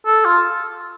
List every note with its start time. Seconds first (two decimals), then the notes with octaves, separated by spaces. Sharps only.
0.06 A4
0.25 F4